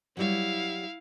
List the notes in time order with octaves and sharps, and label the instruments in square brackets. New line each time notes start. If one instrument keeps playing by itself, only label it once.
[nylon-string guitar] F#3 G3 C#5 [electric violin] E4 F5